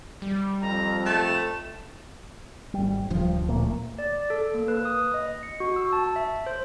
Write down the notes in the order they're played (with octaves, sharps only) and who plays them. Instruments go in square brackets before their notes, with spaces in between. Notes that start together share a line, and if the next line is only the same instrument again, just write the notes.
[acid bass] G3
[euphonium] F2 [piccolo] A#5
[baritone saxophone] A3 [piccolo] E7
[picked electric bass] G#1 G3
[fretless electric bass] D1 F3 [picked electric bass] G2
[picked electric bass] A#2 A3 A#3
[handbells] D5
A4
A#3
B4
D#6
D#5
C#7
F#4
E6
A5
E5
C5